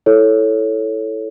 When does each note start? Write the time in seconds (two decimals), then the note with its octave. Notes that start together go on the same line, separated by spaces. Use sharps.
0.06 E4 A4 C#5